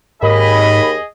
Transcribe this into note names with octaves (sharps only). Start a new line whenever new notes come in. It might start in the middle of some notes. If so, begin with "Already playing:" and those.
D#2 G#2 D#3 G#4 D#5 B5